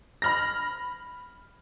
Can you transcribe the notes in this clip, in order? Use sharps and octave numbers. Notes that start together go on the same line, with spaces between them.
B5 F6 A#6